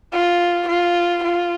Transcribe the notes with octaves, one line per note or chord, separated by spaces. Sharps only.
F4
F4
F4